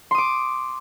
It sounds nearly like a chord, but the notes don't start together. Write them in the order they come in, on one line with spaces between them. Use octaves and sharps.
C6 D#6 D6